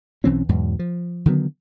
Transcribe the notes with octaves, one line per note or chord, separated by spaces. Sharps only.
B1 E3 C4 C#4
E2 G#2 B2 F#3
F3
D3 D#3 F#3 B3